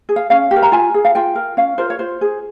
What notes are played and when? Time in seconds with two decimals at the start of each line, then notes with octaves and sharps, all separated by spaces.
0.09 G#4
0.16 F5
0.30 C#4 F5
0.51 G4
0.56 A#4
0.63 A#5
0.72 F4 G#5
0.94 G#4
1.05 F5
1.15 F4 G5
1.36 A#4
1.57 C#4 F5
1.78 F4 A#4 C5
1.90 C#5
1.99 F4 C5
2.21 G#4